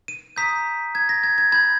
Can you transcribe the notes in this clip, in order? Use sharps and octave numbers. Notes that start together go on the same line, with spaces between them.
D#7
A#5 D#6 G6 B6
G#6
A#6
G#6
G#6
B5 G6 G#6